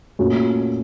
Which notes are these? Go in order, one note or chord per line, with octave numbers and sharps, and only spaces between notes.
A#2 A3 C#4 F#4